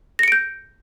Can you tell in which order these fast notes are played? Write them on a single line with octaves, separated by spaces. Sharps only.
A#6 C#7 D7 G6